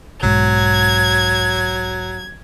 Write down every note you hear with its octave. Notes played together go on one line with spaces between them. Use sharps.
B1 G#2 F#3 G#6